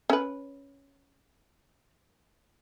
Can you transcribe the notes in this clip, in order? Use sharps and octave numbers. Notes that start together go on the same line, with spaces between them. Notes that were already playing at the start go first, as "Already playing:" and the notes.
C#4 B4